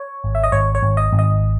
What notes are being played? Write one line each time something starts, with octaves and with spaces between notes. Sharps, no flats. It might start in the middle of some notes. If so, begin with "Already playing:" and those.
Already playing: C#5
G#1
E5
D#5
G#1 C#5
C#5
G#1
D#5
G#1
D#5